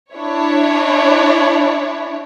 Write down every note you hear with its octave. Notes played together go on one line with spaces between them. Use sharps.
D4 E4 C#5